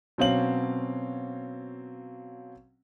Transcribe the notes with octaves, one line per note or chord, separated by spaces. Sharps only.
B2 F#3 C4 C#4 F5 F#7